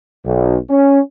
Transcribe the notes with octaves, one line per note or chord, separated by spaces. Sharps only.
B1
C#4